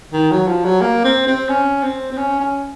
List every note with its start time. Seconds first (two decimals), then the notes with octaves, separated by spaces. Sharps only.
0.13 D#3
0.31 F#3
0.47 F3
0.65 F#3
0.81 A#3
1.04 C4
1.27 C4
1.49 C#4
1.83 C4
2.12 C4
2.17 C#4
2.40 C#4